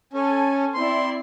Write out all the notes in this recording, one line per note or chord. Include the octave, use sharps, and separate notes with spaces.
C#4 A4 G#5
C4 E4 D5 C6